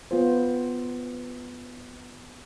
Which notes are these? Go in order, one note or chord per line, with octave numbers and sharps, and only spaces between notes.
B3 F4 C5